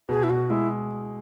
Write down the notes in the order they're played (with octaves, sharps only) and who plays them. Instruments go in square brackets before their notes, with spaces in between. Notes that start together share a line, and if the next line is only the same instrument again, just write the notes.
[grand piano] B2 [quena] G#4
[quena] E4
[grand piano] B2 [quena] F#4
[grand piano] G#3 [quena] E4